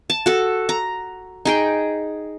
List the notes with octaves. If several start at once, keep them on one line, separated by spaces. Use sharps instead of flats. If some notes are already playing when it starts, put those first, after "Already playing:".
A5
F#4 A4
A#5
D#4 G#4 G5